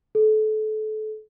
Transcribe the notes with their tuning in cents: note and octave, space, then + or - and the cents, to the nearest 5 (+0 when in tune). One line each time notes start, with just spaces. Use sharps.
A4 -30